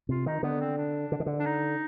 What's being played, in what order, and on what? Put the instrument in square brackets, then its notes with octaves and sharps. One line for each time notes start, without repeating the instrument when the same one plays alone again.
[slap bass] C3 [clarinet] F4
[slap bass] D#3 [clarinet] D#4
[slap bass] D3 [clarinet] B3
[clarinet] C4
D4
[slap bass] D3
D#3
D3
[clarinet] D4
D#4